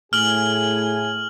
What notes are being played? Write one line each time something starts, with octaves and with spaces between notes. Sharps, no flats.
A2 G#4 G#5 F6 F#7